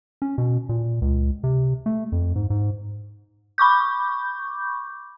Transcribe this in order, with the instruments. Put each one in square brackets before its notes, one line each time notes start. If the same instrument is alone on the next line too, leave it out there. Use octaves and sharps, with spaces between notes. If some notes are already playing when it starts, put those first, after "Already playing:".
[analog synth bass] C#4
B2
A#2
C#2
C3
A3
F2
G#2
G#2
[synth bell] B5 C#6 D6 G6